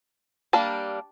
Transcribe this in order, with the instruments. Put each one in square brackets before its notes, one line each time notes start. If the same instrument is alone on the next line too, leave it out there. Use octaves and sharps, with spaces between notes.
[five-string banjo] G3 A#3 D4 A5